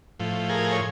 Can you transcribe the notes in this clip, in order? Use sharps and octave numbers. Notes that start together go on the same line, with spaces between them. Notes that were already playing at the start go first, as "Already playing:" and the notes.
A2 F3
G#4 A#4
C#5